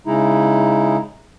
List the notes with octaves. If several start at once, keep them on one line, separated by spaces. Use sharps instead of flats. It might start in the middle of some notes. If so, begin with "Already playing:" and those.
C#3 G#3 D#4 E4